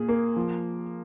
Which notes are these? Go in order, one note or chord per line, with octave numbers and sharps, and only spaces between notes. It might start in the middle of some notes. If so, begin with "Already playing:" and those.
Already playing: A#2 G#4
A#3
F3